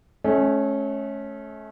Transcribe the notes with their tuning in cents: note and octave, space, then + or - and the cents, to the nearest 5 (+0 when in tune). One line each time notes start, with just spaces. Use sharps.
A3 -35 C#4 -10